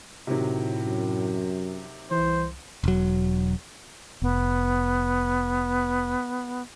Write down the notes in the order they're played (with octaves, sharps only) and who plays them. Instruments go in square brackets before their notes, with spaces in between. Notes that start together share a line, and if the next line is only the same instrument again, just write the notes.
[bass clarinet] A2 [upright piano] C3 D#3 F#3
[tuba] F#2
[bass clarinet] C2 [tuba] E3 [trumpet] C5
[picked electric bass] E1 F#3
[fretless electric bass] F1 [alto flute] B3